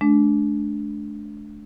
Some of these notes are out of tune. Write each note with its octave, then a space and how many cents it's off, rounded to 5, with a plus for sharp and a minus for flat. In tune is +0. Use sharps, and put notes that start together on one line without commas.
A3 -45 D4 -5